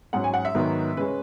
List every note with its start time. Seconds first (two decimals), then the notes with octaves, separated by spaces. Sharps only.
0.13 G#2 F#3 C#4 F#5
0.24 G#5
0.34 F#5
0.45 E5
0.55 G#2 D#3 F#3 B3 D#4
0.96 C#3 G#3 C#4 B4